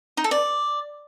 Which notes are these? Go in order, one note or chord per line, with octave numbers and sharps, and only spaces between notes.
D#4
A4
D5